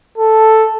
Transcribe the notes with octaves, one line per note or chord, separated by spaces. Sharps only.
A4